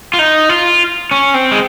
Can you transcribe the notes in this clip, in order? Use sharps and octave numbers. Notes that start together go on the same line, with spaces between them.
F4
D#4
F4
C#4
C4
G#3